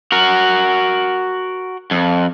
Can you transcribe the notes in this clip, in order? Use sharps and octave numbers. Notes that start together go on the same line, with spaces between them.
F#4 A#4
F2